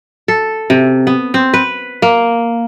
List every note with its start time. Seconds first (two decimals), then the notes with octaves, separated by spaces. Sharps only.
0.28 A4
0.70 C3
1.07 B3
1.34 C4
1.54 B4
2.02 A#3